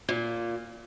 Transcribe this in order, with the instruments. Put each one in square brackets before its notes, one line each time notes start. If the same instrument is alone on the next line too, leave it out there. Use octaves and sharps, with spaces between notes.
[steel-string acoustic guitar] A#2